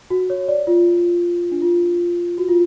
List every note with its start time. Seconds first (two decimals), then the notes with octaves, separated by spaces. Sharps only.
0.10 F#4
0.30 C#5
0.48 D5
0.67 F4
1.52 D4
1.62 F4
2.38 F#4
2.48 F4